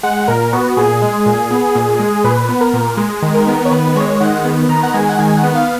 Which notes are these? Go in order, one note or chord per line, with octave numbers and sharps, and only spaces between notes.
G#3 F#5
A#2 A#4
B3 F#4
A#2 G#4
G#3
A#2
B3
A#2
G#3
A#2 B4
B3
A#4
A#2
G#3
D#3
A#4
B3
C#5
D#3 B4
G#3 C#5
D#3 F#5
B3
D#3 A#5
F#5
G#3 G#5
F#5
D#3 G#5
F#5
B3
F5